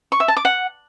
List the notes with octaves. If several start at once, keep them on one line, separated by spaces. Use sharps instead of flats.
C#6
E5
A5
D6
F#5